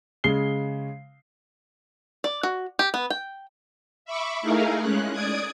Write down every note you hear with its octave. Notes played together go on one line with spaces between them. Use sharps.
C#3 G#3 C7 G7
D5
F#4
G4
B3
G5
E5 B5 C#6 D6
A3 D#4 E4 G#4 A#4 F5
G#3 C#4 F#6
D5 D6 D#6 G#6